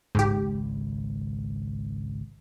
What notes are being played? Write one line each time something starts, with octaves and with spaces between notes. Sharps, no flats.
G#1 C#2 G#2 G4